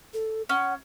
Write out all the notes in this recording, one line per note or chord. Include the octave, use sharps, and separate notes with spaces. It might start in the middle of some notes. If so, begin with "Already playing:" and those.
A4
C#4 F#5